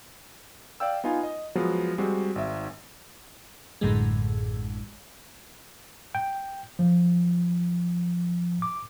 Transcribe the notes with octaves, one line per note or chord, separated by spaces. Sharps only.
D5 F5 G5 E6
B3 D#4 F4 G#5
D#5
F3 F#3 G#3 B3
G3 G#3 C4 F#4
G#1 E5
A1 F#2 A2 D3 E3 G#3
G5
F3
D6